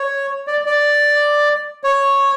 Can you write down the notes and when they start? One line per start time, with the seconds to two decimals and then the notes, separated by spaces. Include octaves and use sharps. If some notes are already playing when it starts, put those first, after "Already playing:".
Already playing: C#5
0.47 D5
0.66 D5
1.84 C#5